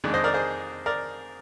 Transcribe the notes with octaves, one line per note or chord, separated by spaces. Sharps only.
F2 D#3 G#3 D4
C5 D#5
A#4 D5
G#4 C5
A#4 D5